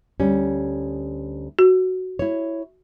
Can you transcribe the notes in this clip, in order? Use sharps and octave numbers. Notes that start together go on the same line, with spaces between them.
D2 G3 C#4
F#4
E4 C#5